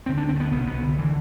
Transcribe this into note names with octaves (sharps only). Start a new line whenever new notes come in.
D2 D3 C4
D4
C4
A3
B3
C2 B2 B3
B3
D3
D3 E3